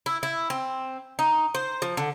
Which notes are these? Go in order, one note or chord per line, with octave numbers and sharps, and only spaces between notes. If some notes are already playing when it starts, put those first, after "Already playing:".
E4
E4
C4
D#4
C5
F3
D3